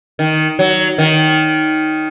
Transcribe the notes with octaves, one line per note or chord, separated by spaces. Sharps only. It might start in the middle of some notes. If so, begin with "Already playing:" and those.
D#3
F#3
D#3